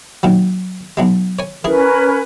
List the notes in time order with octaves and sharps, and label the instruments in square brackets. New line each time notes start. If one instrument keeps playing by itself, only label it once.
[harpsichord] A#2 D#3 F#3
B1 F#3 G#3
C#5 G#5
[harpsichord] E3 G#4 [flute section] C#4 A#4 B4